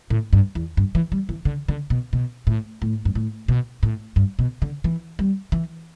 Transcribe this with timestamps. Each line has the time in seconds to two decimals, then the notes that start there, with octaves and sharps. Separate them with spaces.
0.10 A2
0.33 G2
0.55 E2
0.77 G2
0.95 E3
1.12 G3
1.29 E3
1.45 D3
1.68 D3
1.90 B2
2.13 B2
2.47 A2
2.82 A2
3.05 G2
3.15 A2
3.48 B2
3.83 A2
4.16 G2
4.39 B2
4.62 D3
4.84 E3
5.19 G3
5.52 E3